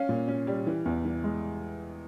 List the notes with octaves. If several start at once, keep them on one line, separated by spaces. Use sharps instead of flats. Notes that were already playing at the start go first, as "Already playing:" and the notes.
Already playing: C#4 F5
A#2
C#4
G3
E3
E2
E3
G#3